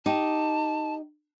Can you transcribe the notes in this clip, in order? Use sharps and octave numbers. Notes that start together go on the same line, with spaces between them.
D#4 G4 A5